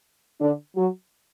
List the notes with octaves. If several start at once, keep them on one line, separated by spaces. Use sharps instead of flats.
D3 D4
F#3 F#4